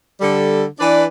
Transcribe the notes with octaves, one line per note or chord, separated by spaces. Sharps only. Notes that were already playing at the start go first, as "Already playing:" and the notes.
D3 G3 A4
E3 D4 B4 D5